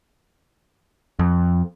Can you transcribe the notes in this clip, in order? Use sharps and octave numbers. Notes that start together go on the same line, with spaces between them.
F2